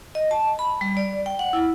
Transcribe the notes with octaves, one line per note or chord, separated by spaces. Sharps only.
D#5
A5
B5
G3
D5
G5
F#5
E4